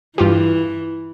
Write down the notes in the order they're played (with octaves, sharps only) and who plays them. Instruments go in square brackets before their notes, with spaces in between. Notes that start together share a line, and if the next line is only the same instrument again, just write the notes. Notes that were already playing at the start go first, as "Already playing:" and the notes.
[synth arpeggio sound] G2 F4 G4 [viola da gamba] E3